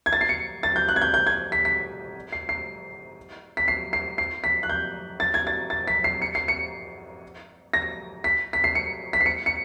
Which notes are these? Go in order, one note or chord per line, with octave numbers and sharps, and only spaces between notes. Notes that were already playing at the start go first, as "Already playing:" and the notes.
G#6
A6
C7
C#7
A6
G6
F#6
G#6
G6
G6
G#6
B6
B6
C7
C7
B6
C7
C7
C7
B6
F#6
G6
A6
G#6
A6
A6
B6
C7
C#7
C7
C#7
A#6
B6
B6
C7
C#7
B6
C7
C#7
C#7